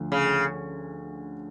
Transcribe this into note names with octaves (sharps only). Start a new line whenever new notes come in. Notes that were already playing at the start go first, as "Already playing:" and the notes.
Already playing: D2 D3 F3
C#3